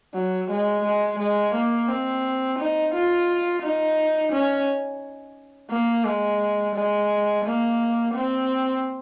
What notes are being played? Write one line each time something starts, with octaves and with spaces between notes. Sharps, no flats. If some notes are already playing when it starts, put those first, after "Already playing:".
F#3
G#3
G#3
G#3
A#3
C4
D#4
F4
D#4
C#4
A#3
G#3
G#3
A#3
C4